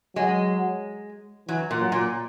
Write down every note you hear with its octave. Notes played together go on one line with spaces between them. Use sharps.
F#3 G#3
E3 F#3
A#2
F#3
A#2